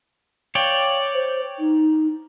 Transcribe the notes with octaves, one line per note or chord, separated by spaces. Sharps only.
C#5 D5 F5 G5
C5
D#4